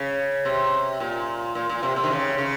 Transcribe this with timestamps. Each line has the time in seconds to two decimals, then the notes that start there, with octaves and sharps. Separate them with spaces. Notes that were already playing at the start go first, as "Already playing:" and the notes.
Already playing: C#3
0.45 C3
1.00 A#2
1.55 A#2
1.69 A#2
1.83 C3
1.96 C3
2.03 D#3
2.10 C#3
2.38 C#3